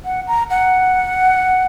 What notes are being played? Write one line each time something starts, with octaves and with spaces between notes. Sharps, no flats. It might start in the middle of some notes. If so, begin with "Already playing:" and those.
F#5
A#5
F#5